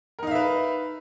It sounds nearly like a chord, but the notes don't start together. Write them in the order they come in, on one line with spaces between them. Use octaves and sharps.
A#4 D#4 F5 E5 B4